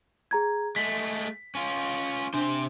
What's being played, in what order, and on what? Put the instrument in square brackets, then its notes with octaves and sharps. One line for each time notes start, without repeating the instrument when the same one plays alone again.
[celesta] G#4 A#5 G#6
[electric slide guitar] G#3 A3 [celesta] B6
[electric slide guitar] C#4 F4
[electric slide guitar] C3 C5 [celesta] D4